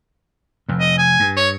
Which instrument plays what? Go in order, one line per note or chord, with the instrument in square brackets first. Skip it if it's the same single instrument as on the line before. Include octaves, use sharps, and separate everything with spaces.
[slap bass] F1 F2
[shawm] D#5
G#5
[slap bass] G2
[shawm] C#5